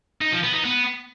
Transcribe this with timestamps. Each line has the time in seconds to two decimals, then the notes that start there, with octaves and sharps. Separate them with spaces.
0.21 D#4
0.32 F3
0.43 B3
0.54 D#4
0.65 B3